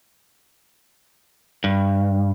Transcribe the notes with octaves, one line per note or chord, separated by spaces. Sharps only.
G2